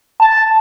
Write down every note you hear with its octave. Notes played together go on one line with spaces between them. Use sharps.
A5